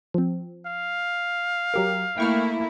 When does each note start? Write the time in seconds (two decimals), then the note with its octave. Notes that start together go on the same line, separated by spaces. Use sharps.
0.14 F3 C4
0.67 F5
1.74 F#3 G4 A#4
2.18 A3 A#3 E4 G5 C#6 F6